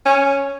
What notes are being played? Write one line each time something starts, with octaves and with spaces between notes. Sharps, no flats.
C#4